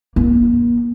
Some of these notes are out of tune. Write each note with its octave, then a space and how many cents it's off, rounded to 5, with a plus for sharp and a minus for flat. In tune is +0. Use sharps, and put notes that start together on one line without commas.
A#3 +40